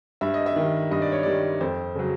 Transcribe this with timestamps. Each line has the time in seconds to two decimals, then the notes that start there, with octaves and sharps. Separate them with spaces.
0.21 G2 E5
0.34 D#5
0.46 E5
0.56 D#3 G3
0.91 G2 D#5
1.02 D5
1.12 C#5
1.23 D#3 G3 D5
1.61 F2 C5
1.95 C#3 F#3